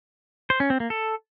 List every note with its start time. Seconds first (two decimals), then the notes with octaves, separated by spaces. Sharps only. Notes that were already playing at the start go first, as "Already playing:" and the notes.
0.50 C5
0.60 C#4
0.70 C4
0.80 A#3
0.90 A4